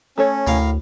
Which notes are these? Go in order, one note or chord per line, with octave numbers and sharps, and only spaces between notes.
A3 C#4 A4 C#5
D2 A2 A#4 F5